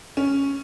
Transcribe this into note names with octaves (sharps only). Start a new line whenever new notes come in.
C#4